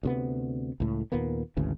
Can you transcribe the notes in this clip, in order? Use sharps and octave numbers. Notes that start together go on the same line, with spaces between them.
D2 C3 B3
C#2 A2
D#2 A#2 A#3 B3
G#1 D2 C#3 E3